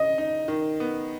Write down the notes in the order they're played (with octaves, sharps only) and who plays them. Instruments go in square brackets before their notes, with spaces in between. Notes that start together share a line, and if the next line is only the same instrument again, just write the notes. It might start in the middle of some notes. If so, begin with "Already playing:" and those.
Already playing: [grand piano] D#5
[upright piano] D#4
D#3
B3